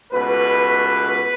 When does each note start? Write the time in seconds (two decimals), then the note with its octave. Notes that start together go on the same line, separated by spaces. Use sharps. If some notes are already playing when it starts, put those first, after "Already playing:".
0.12 C#2 B2 A3 B4